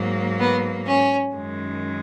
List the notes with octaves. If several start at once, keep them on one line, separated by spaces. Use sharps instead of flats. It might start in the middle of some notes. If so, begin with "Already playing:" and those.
Already playing: G#2 F#3 A#3
B3
C#4
F#2 D#3 G#3